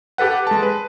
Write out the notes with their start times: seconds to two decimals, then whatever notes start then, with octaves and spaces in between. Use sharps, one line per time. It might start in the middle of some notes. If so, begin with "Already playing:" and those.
0.18 G4 A4 B4 F#5
0.47 G#3 A5
0.63 B4